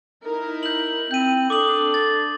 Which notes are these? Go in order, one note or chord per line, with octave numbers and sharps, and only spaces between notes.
D#4 E4 A#4
G6 F#7
C4 E4 G6 D#7
D4 A4 D6 D#6 F#7
A6